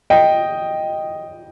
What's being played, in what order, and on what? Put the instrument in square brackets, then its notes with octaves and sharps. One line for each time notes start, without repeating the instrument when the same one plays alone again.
[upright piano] D#5 G5